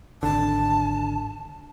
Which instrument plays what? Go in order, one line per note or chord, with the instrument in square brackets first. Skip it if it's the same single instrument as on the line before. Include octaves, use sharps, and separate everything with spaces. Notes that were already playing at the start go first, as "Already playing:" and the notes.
[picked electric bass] G#1 D3 [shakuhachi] A5